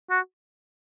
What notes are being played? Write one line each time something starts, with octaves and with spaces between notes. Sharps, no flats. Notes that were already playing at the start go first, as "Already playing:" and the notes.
F#4